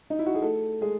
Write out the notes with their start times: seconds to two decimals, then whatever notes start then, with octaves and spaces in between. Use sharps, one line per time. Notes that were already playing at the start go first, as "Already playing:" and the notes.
0.10 D#4
0.19 E4
0.26 F#4
0.35 G#4
0.42 A3 A4
0.81 G#3 G#4